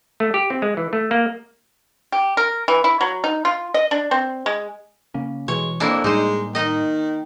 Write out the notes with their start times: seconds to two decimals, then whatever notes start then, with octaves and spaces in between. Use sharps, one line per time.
0.20 A3
0.34 G4
0.50 C4
0.62 G#3
0.77 E3
0.93 A3
1.11 A#3
2.12 G4
2.37 A#4
2.68 E3
2.84 E4
3.01 F#3
3.24 D#4
3.45 F4
3.74 D#5
3.91 D4
4.11 C4
4.46 G#3
5.14 C#3 A#3 C#4
5.48 B2 E3 G#3 C#5
5.80 F2 A#3 D4 E4
6.04 A2 G3 G#3 D#4 C5
6.55 D#3 D#4 D#5